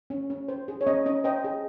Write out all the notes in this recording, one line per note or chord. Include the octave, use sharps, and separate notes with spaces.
C#4
C#4
C5
G#4
C#5
C#4 D#5
C#4 D#5
C5 D#5 G5
G#4